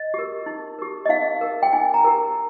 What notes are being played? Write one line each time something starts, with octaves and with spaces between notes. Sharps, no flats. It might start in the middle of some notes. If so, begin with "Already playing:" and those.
Already playing: D#5
G4 A#4
D#4
G4 A#4
D#5
D#4 F5
G4 A#4
G5
D#4 G#5
A#5
G4 A#4